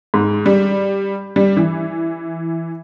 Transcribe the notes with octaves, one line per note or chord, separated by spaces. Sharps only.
G#2
G3
G3
E3